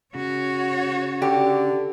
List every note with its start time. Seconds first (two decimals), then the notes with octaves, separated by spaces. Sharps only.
0.15 C#3 F#4 C#5
1.22 D3 G4